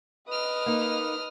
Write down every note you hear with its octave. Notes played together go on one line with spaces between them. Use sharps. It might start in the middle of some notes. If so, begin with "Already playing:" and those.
B4 D#5 D#6 F6
A#3 D#4